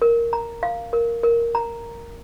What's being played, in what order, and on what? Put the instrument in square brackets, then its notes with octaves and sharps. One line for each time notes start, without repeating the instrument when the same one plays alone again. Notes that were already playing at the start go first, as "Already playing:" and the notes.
[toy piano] A#4
A#5
F5
A#4
A#4
A#5